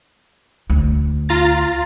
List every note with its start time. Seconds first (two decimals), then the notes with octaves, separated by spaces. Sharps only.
0.70 D2
1.29 F4 A#5 A6